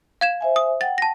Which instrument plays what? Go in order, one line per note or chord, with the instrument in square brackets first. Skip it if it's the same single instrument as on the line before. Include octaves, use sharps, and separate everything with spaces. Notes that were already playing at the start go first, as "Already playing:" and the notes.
[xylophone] F5 G#6 E7
[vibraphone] C5 E5 G#5
[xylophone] D#6
[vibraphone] F#5 G5 [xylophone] A6
[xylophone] A5 A#6